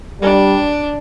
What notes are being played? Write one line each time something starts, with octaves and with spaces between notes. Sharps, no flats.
G3 D4